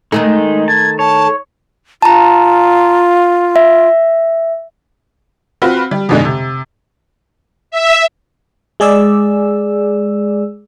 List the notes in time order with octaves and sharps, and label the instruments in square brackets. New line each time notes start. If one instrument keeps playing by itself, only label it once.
[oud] D#3 A3 A4 [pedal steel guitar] G#3 D#4
[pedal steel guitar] A5 [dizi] G#6
[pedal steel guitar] C#5 [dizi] A5
[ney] F4 [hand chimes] A5 A#5
[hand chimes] E5
[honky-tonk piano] C4 F4 F#4 B4
G3
F2 G#2 B2 D3 G#3
C3
[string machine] E5
[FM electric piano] G#3 G#4 D5 E6